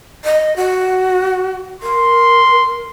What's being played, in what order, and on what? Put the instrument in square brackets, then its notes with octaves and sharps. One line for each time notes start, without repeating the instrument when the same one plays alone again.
[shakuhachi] D#5
F#4
[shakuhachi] A#4 [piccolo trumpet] C6